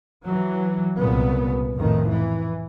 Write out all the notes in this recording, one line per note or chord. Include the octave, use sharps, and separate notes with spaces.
E3 F#3
C2 A#2 C#3 B3
F2 A2 D#3
E3